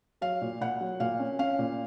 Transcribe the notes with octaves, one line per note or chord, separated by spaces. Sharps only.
F#3 F5
A#2
A#2 F#5
F#3
A#2 F5
C#4
C#4 F5
A#2